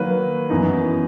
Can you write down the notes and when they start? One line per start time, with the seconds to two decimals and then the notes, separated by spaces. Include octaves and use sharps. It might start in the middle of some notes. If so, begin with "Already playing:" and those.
Already playing: D#3 F#3 A#3 B4
0.50 F#2 E3 B3 D#4